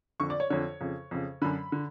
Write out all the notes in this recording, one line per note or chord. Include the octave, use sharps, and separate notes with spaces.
F2 D3 C#6
D5
C#5
F2 D3 C#5
F2 C#3
F2 C#3
F#2 D3 B5
D3